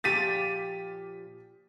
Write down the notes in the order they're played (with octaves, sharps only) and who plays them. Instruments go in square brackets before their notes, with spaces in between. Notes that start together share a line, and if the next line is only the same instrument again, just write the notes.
[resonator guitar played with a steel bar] A#2 F3 G4 [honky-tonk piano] A6 B6 D#7